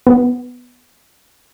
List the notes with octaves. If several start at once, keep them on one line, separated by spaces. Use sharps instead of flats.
B3